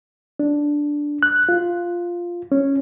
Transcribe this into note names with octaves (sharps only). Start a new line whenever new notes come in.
D4
F#6
F4
C#4